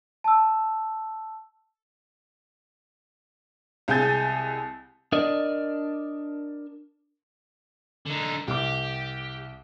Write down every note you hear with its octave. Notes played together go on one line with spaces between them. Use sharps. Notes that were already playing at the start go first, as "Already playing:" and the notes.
A5 E6
C2 G#3 C4 G#5 G6 A6
D4 A#4 D5 D#5
D3 D#4
C2 G4 D6